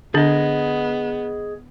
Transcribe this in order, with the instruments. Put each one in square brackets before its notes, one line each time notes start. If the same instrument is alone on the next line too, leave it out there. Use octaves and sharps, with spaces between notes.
[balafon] D3 D4 [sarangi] B3 [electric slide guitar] G#4 D#5